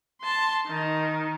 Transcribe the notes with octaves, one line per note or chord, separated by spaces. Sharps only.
A5 C6
D#3 D#4